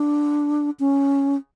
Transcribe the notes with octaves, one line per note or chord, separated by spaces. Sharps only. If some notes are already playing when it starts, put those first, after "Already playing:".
Already playing: D4
C#4